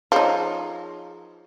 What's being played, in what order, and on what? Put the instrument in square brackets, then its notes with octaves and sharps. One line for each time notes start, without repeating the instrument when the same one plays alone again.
[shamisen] F3 D#4 [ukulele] G#4 C#5 A5